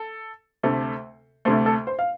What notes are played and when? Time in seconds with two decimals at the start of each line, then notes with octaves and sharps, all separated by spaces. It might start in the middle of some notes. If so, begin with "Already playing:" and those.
Already playing: A4
0.63 D2 C3 A3
1.45 D2 C3 A3 C5
1.66 A4
1.87 C5
1.99 F5